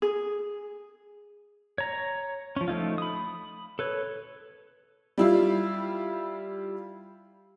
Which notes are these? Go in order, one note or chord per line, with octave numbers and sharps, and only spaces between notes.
G#4
C#5 A#5
F3 C#4
F3 A3 D#4 F4
B5 D#6
A4 B4 C#5
G3 E4 F4